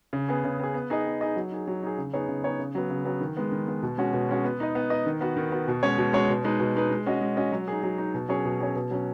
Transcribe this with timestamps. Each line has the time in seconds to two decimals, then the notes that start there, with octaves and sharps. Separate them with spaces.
0.13 C#3
0.29 B3 G#4
0.44 C#3
0.60 B3 G#4
0.74 B3
0.90 D#4 G#4 D#5
1.06 B3
1.21 D#4 G#4 D#5
1.36 F#3
1.51 D#4 G#4
1.67 F#3
1.83 D#4 G#4
1.98 C#3
2.14 B3 D#4 G#4 C#5
2.29 C#3
2.44 B3 D#4 G#4 C#5
2.59 C#3
2.75 F#3 B3
2.90 C#3
3.05 F#3 B3
3.21 D#3
3.37 G#3 B3
3.52 D#3
3.68 G#3 B3
3.83 B2
3.98 G#3 C#4 F#4
4.13 B2
4.29 G#3 C#4 F#4
4.44 B3
4.60 D#4 B4 D#5
4.75 B3
4.90 D#4 B4 D#5
5.06 D#3
5.21 B3 F#4
5.37 D#3
5.52 B3 F#4
5.68 B2
5.83 G#3 C#4 F#4 C#5
5.98 B2
6.13 G#3 C#4 F#4 C#5
6.30 B2
6.44 G#3 D#4 B4
6.60 B2
6.75 G#3 D#4 B4
6.91 G#3
7.06 C#4 F#4 D#5
7.21 G#3
7.37 C#4 F#4 D#5
7.52 F#3
7.68 D#4 G#4
7.83 F#3
7.98 D#4 G#4
8.14 B2
8.29 F#3 C#4 G#4 C#5
8.45 B2
8.60 F#3 C#4 G#4 C#5
8.76 B2
8.91 F#3 C#4